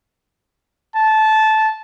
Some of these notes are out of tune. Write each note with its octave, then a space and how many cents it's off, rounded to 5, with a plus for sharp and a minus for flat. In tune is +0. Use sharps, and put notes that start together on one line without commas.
A5 -15